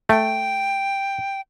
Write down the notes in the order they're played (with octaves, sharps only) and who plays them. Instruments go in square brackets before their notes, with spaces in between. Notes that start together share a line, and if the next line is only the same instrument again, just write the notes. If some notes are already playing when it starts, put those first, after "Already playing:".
[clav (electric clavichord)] A3 [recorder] G5